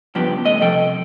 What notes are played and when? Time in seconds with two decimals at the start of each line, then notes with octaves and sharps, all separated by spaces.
0.15 G2 C#3 F3 B3 G4
0.45 A3 D#5
0.61 C3 F3 A4 G5